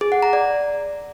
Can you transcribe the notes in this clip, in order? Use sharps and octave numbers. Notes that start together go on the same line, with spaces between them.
G#4
F#5
A#5
D5